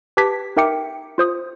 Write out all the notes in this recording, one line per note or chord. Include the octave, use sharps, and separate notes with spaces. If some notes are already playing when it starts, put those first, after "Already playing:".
G4 B4 A5 D6 G#6 B6
D#4 A#4 E5 G5 D6 C#7
F4 C5 D#6